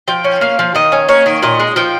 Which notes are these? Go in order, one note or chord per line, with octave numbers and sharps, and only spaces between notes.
F3 G5
C#4
A#3 F5
F3
D#3 D#5
C#4
A#3 C#5
D#3
A#2 D#5
G#3
F3 G5